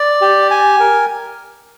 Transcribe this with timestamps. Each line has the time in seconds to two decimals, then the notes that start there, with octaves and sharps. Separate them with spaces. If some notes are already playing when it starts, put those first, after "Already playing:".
Already playing: D5
0.21 G4
0.51 G#5
0.80 A#4